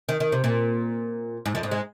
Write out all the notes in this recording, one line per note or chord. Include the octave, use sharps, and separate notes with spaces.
D#3
D#3
C3
A#2
G#2
F2
G#2
G#3